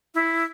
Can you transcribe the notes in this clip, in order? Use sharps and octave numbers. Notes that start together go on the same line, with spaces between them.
E4